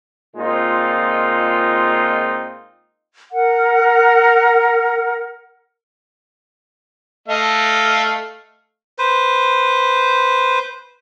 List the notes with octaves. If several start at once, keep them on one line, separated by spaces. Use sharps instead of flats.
A#2 G#3 C4 D#4 F4
A#4 F#5
A3 D#5 F5
B4 C5